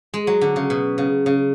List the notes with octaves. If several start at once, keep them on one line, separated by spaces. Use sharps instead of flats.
G#3
F#3
D3
C#3
B2
C#3
C#3